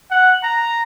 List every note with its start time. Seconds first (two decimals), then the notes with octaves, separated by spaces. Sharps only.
0.11 F#5
0.43 A#5